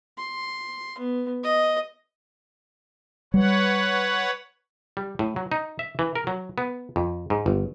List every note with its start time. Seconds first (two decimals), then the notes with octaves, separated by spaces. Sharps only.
0.18 C6
0.98 B3
1.44 D#5
3.34 G3 B4 C#5 F#5
4.97 G3
5.19 A2
5.36 F#3
5.52 D#4
5.79 E5
5.99 E3
6.15 A#4
6.27 F#3
6.58 B3
6.96 F2
7.30 G#2
7.46 G1